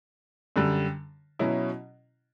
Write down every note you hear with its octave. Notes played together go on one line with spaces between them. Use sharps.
F#2 D3 G3
B2 F#3 C#4 E4